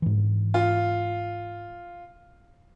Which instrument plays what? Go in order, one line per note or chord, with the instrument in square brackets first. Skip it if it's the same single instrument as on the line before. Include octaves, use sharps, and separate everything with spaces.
[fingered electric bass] G#2 E3
[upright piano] F4